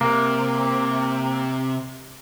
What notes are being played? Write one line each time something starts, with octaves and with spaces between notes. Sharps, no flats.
C3 A#3